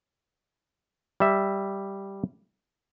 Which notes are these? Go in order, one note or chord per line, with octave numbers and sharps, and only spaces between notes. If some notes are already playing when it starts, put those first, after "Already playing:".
G3 E5